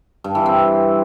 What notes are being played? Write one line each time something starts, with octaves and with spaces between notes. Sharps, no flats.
G2
E3
C4